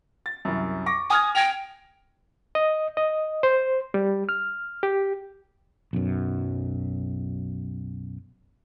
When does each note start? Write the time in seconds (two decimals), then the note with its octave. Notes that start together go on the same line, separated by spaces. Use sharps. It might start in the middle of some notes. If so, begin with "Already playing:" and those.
0.26 A6
0.45 C2 F#2
0.86 C#6 D6 A#6
1.10 G#5 D#6 F6 G#6
1.35 G5 G#6 A#6 F7
2.55 D#5
2.97 D#5
3.43 C5
3.94 G3
4.29 F6
4.83 G4
5.93 B1 F#2